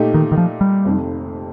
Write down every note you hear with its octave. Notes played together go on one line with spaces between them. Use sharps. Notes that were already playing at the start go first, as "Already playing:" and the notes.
Already playing: A#2 A3 D#4 G4
D#3
D#3
F3
G3
F1 F2 C3 D#3